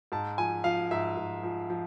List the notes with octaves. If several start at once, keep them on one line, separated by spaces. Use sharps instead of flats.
G#2 A5
F3 G#5
F3 F5
G#2 E5
G#2
F3
F3